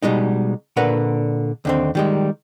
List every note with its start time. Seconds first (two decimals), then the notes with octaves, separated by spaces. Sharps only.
0.03 B2 G3 G#3 D#4
0.76 A#2 D3 A#4 B4 F#5
1.65 D#2 D3 C4
1.95 D#3 G3 G#3